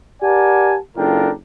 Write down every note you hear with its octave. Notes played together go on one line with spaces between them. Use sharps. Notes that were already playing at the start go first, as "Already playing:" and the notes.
G4 A#4 D5 F#5 G#5 A5
F#1 D4 F4 A4 A#4 G5